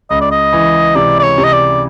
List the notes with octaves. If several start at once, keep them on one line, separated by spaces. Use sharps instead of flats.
C#2 D#5
D5
D#5
E3
C3 D5
D5
C#5
C3
D#5
D5